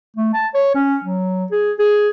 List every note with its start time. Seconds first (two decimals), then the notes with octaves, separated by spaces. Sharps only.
0.16 A3
0.33 A5
0.54 C#5
0.75 C#4
1.04 F#3
1.51 G#4
1.79 G#4